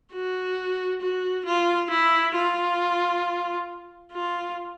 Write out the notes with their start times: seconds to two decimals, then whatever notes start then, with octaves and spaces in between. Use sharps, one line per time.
0.13 F#4
1.01 F#4
1.45 F4
1.90 E4
2.35 F4
4.12 F4